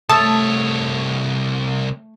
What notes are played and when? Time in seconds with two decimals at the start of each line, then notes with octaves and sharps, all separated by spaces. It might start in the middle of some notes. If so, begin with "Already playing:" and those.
0.09 C2 A3 C#5 A5 D#6 E6 A6